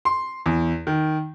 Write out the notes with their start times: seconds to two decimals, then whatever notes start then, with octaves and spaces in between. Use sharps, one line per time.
0.05 C6
0.46 E2
0.87 D#3